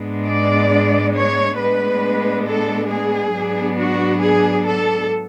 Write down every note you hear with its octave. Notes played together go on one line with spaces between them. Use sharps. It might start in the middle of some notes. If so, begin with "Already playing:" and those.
Already playing: G#2 G#3 B3 D4
D5
C#5
A2 G#3 B3 D4 B4
A4
G#4
G#2 F#3 B3 D4
F#4
G#4
A4